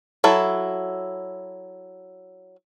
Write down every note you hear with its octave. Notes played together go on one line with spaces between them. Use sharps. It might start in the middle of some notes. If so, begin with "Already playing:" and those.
F#3 E4 A4